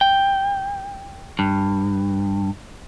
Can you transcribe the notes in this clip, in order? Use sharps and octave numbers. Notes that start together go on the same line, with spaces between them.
G5
G2